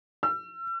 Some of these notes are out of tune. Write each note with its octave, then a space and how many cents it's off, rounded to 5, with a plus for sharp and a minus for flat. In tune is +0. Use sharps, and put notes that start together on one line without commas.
E6 +40